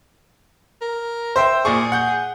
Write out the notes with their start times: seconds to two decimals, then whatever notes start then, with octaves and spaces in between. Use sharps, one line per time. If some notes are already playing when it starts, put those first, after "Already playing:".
0.81 A#4
1.36 C5 E5 G5
1.65 A#2 G#4 D5 C#6
1.92 F#5 G6